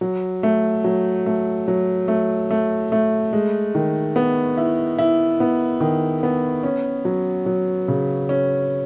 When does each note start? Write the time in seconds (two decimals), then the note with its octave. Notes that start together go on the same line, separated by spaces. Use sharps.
0.01 F#3
0.43 A3
0.84 F#3
1.26 A3
1.68 F#3
2.08 A3
2.51 A3
2.92 A3
3.33 G#3
3.75 D#3
4.16 B3
4.57 E4
4.98 E4
5.40 B3
5.80 D#3
6.23 B3
6.63 C#4
7.05 F#3
7.46 F#3
7.88 C#3
8.29 C#4